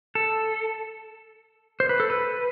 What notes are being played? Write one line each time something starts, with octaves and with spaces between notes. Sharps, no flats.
A4
C5
B4
A4
B4